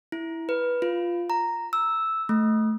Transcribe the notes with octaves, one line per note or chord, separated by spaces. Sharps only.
E4
B4
F4
A#5
E6
A3